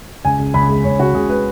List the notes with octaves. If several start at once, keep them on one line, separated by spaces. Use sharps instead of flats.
C#2 G#5
C#2
C#2 B5
G#3
C#2 C#5
C#3 F#4
C#2 G#4
G#3 B4